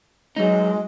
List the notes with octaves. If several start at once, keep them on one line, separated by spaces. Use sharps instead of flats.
F#3 G#3 D#4